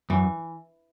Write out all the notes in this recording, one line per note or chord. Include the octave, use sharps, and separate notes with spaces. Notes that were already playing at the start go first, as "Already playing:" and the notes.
F#2 E3